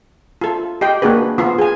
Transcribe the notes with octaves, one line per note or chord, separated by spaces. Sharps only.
F4 A4
G4 D#5 G5
A#3 D4 F#4 G#4 B4
B3 F4
G#4 G#5